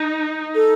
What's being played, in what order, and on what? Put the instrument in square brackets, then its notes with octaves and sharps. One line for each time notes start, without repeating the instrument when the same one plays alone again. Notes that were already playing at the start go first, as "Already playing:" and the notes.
Already playing: [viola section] D#4
[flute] A4